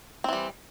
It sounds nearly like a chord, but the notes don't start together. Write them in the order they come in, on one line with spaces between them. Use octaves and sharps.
C4 E3 G3